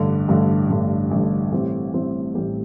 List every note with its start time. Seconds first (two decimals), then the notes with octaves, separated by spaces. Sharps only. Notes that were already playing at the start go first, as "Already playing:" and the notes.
Already playing: A1 G2 D3
0.28 A1 G2 D3
0.70 A1 G2 D3
1.11 A1 G2 D3
1.52 A1 A2 G3 C4 G4
1.94 A1 A2 G3 C4 G4
2.35 A1 A2 G3 C4 G4